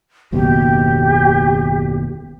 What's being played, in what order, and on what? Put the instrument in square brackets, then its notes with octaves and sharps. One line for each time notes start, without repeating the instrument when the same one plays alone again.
[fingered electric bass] F#1 D#2 B2 [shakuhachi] G4